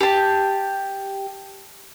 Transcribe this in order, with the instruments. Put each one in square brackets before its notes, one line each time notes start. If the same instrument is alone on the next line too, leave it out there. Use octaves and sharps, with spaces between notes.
[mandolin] G4 A5